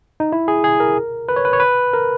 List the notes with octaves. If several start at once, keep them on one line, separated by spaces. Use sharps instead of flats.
D#4
E4
G#4
G#4
A#4
B4
C#5
B4
C#5
B4
A#4